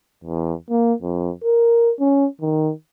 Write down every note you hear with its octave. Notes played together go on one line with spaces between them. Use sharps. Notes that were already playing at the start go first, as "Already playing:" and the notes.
E2
A#3
F2
A#4
C#4
D#3